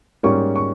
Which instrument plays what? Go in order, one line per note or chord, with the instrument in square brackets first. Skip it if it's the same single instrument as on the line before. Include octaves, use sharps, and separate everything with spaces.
[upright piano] G#2 G3 A#3 C#4 C#6
C#6